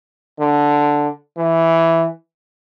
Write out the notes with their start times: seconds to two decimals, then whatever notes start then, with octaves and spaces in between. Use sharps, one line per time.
0.40 D3
1.37 E3